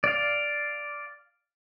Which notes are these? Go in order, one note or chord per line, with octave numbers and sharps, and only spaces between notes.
D5 F5